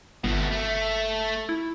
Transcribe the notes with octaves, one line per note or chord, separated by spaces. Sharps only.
G1 B2 A3
A3
E4